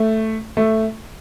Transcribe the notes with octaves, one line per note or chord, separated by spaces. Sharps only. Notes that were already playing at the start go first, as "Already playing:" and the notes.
Already playing: A3
A3